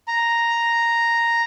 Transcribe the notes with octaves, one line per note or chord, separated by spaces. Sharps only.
A#5